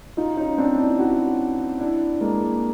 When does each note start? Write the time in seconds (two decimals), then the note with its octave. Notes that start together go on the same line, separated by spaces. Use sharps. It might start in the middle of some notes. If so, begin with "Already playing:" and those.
0.17 D#4 F4
0.37 C#4 D#4
0.58 C4 D4
0.78 D4 E4
0.99 E4 F#4
1.80 D4 E4
2.21 G#3 A#3